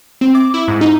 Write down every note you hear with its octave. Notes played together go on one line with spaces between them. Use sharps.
C4
D6
E4
G#2
D#4